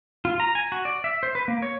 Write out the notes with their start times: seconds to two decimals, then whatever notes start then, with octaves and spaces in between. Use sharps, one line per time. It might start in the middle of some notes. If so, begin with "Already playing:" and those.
0.25 F4
0.40 A#5
0.55 G#5
0.72 F#4
0.85 D5
1.04 E5
1.23 C5
1.35 B4
1.48 A#3
1.62 C#5